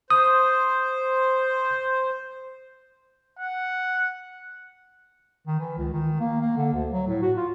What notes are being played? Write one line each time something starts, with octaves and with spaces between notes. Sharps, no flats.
C5 D#6
F#5
D#3
E3
C#2
D#3
A#3
A#3
D3
D2
F#3
A2
F#4
F4